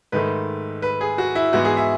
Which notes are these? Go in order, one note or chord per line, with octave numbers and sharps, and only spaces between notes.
G#2 D#3 A3 B4
B4
G#4
F#4
E4
G#2 E3 B3 F#4
G#4
E5